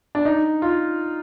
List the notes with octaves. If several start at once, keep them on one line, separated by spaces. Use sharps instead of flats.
D4
D#4
F4